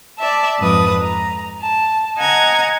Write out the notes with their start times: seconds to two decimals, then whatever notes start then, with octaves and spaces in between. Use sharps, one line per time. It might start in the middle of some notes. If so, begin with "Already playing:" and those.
0.18 D5 E5 A5
0.60 F2 G#2 B4 D#6
1.02 A#5
1.61 A5
2.19 D#5 F#5 G#5 A#5 G#6